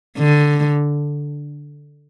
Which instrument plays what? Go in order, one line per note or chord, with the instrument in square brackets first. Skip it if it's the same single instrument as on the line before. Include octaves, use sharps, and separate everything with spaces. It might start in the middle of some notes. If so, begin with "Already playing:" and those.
[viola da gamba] D3